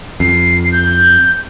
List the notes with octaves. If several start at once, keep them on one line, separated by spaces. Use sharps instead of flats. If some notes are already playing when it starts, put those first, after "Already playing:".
F2 C7
G6